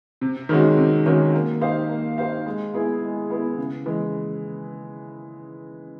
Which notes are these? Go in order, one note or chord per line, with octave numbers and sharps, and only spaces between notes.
C3
D#3 G#3 C#4 F#4
C3
D#3 G#3 C#4 F#4
A#3
D#4 G4 C5 F5
A#3
D#4 G4 C5 F5
G#3
B3 E4 G#4
G#3
B3 E4 G#4
C#3
E3 G#3